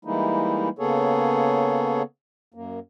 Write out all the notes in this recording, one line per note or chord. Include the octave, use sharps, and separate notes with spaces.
E3 G3 G#3 A#3 D#4 E4
C#3 A#3 B3 G#4 A4 C#5
F#2 A#3